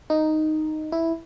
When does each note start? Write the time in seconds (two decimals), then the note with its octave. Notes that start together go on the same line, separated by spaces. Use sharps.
0.10 D#4
0.92 E4